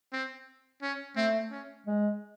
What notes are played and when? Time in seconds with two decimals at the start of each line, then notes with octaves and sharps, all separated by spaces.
0.13 C4
0.82 C#4
1.16 A3 C4
1.51 C#4
1.87 G#3